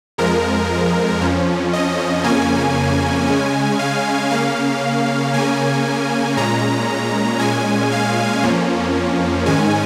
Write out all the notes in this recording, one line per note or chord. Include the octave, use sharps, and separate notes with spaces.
F2 F3 G#3 A#4
F2 F3 C#4
D#5
F2 C#3 A#3 C#4 G#5
C#3 G#3 C#4
F5
C#3 A#3 C#4 F5
C#3 A#3 C#4 G#5
A#2 G#3 C#4 A#5
A#2 G#3 C#4 G#5
F5
F2 F3 A#3 C#4
G#2 D#3 G#3 C#4 G#5